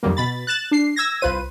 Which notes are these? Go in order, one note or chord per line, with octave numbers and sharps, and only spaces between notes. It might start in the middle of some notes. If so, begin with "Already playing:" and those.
F2 D#3 F#3 G3 A#3
B2 B5 A6
F#6 A6 E7
D4 C7
E6 G#6 A#6
C2 F4 B4 C5 D#7